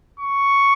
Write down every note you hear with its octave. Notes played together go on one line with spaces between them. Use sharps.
C#6